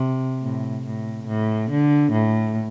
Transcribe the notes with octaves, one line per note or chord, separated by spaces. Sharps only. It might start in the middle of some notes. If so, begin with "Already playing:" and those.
Already playing: C3
A2
A2
A2
D3
A2